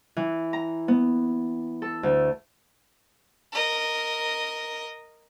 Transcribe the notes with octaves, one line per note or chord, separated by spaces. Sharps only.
E3
A#5
B3
A4
D2
A#4 D#5